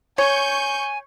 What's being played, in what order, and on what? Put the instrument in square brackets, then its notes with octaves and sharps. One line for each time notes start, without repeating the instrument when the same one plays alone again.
[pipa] C#5 [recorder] G#5 [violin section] C#6 G6